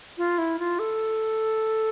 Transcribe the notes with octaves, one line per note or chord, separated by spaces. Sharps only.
F4
E4
F4
A4